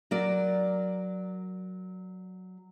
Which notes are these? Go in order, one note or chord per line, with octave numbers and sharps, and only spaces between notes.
F#3 A#4 D5